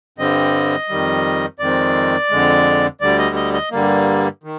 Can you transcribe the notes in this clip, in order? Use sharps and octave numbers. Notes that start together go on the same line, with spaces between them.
G2 D3 G3 C4 D#5
F2 D#3 G3
F2 D#3 G#3 C4 D5
F2 D3 G#3
D2 D3 G3 D5
D#5
D#5
D#5
G2 D3 G3 A#3
D#3